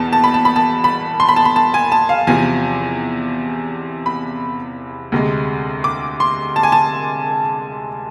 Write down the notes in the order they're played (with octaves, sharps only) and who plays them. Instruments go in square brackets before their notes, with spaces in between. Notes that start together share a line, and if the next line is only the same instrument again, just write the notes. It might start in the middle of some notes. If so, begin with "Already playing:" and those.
Already playing: [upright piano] E2 B2 B3 A5
A5
B5
A5
B5
A5
B5
C6
B5
A5
B5
A5
G#5
A5
F5
E2 C3 F3 G#5
B5
D2 C3 G#3
D6
C6
A5
G#5
A5